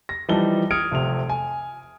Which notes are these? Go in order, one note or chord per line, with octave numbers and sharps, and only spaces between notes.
A#6
E3 F3 G3 D#4 A5 G7
D#6 F6 G#6 C#7 D7
F1 C3 F7
G#5